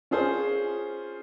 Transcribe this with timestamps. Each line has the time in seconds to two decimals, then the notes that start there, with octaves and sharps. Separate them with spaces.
0.11 C#4 F4 G#4 C5